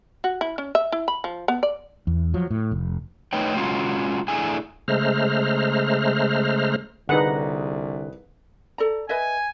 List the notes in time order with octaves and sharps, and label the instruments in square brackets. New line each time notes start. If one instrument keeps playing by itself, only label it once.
[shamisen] F#4
E4
C#4
E5
E4
B5
F3
B3
D5
[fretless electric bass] E2
F3 F#3
A2
F1
[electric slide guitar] A3 D#4 B4 C#5 G5
G#3 C#4 F4 F#4
A3 D4 E4 G#4 G#5
[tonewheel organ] C#3 G#3 A3 C5 A#5 F6
[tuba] C2 [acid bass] D3 [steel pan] D#4 F#5 [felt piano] G#4 B4
[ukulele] A4 D5 A#5
[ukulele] B4 D#5 E5 [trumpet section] G#5